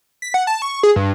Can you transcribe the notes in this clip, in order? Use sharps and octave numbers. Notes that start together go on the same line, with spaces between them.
B6
F#5
A5
C#6
G#4
G2